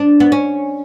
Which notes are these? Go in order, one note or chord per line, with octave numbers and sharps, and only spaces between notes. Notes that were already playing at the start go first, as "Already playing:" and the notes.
Already playing: D4
B3
C#4